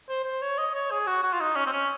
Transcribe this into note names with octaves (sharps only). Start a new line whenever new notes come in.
C5
C5
C#5
D#5
C#5
G#4
F#4
F#4
F4
D#4
C#4
C4
C#4